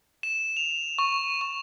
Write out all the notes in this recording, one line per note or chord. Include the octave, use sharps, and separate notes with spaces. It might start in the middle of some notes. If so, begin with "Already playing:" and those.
E7
F7
C#6
C#6